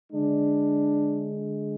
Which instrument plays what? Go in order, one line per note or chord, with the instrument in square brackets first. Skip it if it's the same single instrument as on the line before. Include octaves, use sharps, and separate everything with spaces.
[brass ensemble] D3 G#3 D4